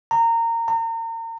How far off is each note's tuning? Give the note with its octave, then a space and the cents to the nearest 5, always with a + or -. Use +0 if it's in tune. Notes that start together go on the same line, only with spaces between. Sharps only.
A#5 -20
A#5 -35